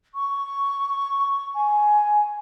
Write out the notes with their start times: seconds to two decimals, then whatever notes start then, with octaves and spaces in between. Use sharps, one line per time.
0.14 C#6
1.54 G#5